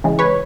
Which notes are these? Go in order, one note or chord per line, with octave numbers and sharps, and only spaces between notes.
C#3 E3 G#3
B4 C#5